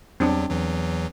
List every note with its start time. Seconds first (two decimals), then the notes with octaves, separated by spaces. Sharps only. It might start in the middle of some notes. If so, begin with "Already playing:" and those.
0.20 E2 F#3 C4 D4
0.51 E2 E3 F#3